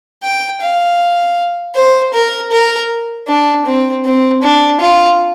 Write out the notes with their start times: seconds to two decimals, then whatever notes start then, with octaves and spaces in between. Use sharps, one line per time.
0.23 G5
0.61 F5
1.75 C5
2.14 A#4
2.52 A#4
3.28 D4
3.66 C4
4.05 C4
4.43 D4
4.81 F4